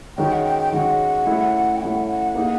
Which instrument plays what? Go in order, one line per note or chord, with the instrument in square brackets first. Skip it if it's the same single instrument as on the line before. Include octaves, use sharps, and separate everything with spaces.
[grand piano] D#3 G#3 C#4 F#4 [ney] G5
[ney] F#5
G5
G5
[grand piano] D#3 G#3 C#4 F#4 [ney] F#5
[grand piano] A3 C#4 E4
[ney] G5
[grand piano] A3 C#4 E4 [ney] F#5
[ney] F#5
[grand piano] A#3 D#4 G#4